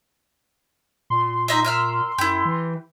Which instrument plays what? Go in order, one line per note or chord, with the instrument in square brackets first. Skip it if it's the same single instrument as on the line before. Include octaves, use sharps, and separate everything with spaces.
[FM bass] A#2 [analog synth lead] C6
[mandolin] D#4 D#5 E5
A#4 E5 F6
[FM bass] F#2 [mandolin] E4 G4
[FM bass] E3